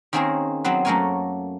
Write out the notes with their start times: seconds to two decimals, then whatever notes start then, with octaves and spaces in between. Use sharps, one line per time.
0.13 D#3 A#3 C4 C#4 G#4 A#4
0.64 F#3 B3 C4 B4
0.85 F#2 A3 A#3 A#4 C#5 G#5